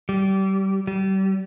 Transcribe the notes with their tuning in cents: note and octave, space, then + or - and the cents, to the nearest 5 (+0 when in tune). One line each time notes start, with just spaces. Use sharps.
G3 -25
G3 -30